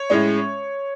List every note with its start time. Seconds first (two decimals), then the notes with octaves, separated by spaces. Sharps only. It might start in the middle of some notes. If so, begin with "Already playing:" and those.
Already playing: C#5
0.10 A2 G#3 C#4